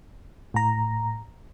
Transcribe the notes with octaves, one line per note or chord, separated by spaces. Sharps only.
A2 A#5